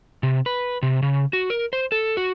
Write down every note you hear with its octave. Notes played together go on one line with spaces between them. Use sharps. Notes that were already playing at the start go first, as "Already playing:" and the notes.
C3
B4
C3
C#3
F#4
A#4
C5
A4
F#4